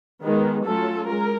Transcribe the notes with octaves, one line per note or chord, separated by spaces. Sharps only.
D#3 G#3 B3
F#3 A3 C#4 F4 A4
G#3 A#4